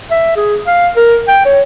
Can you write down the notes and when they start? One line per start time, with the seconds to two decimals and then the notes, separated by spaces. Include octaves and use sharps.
0.11 E5
0.37 G#4
0.67 F5
0.97 A#4
1.28 G5
1.46 C#5